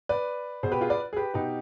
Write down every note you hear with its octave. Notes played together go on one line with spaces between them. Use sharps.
B4 D5
B2 G#4 C5
G4 B4
F4 G#4
B4 D5
G#4
G4 B4
B2 D#4 G4